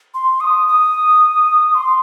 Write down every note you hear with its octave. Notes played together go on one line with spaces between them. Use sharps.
C6
D#6
D#6
C6